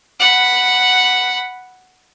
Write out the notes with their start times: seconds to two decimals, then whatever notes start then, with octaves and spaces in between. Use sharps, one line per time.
0.20 F#5 B5